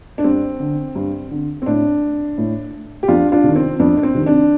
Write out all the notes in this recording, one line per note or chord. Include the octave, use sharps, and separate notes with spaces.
D4
G2 C4
D3
G2
D3
C4
A2 D4
A2
G4
F2 D4 F4
D4 F4
C3 D#3
C4
F2 D4
D4
C4
C3 D#3
D4